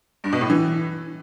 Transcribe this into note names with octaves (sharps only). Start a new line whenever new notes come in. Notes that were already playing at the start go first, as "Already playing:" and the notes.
G2
B2
A2
E3